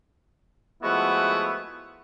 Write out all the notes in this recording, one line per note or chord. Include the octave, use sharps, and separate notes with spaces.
F3 G#3 A3 B3 E4 F#4